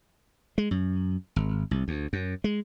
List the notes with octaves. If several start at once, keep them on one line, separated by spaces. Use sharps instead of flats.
G#3
F#2
G#1
C2
D2
F#2
G#3